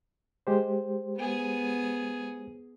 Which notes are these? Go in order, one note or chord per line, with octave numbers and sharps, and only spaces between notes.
G#3 G4 C5
B3 G#4